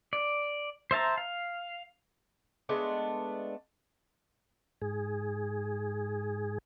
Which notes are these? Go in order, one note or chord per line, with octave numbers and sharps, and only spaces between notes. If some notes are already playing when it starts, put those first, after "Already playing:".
D5
C5 E5 A5 A#5
F5
G#3 A3 B3 D4
G#2 G#4